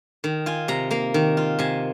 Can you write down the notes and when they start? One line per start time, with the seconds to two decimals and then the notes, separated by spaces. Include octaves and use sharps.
0.24 D#3
0.46 F4 G#5
0.68 C3 A#5
0.91 A#3 A#5
1.14 D#3
1.37 F4
1.59 C3 G#5